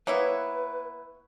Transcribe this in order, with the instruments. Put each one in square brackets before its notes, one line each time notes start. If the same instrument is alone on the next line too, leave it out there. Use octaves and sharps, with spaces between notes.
[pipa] A#3 B3 E4 [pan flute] B4 [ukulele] C#5